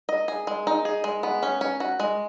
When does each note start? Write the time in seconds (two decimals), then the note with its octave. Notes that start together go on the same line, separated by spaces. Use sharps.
0.09 D#5
0.28 G#4
0.47 G#3
0.67 D#4
0.85 G#4
1.04 G#3
1.23 B3
1.43 C#4
1.61 C#4
1.80 F#4
2.00 G#3